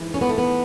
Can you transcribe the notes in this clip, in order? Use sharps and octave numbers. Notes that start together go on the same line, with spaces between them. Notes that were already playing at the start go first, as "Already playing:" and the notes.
Already playing: G#2 E3
C#4
B3
A3
B3